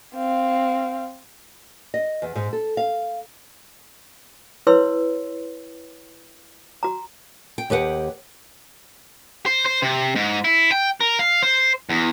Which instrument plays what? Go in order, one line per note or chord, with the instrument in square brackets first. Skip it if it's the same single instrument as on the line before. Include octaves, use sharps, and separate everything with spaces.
[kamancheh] C4 F5
[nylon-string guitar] D#5
E2
G#2
A4
F5
[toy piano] E4 B4 C#5 C6 E6
F#4 A#5
[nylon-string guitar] G5
D#2 G4 B4 F#5
[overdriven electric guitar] C5
C5
C3
G#2
E4
G5
A#4
F5
C5
E2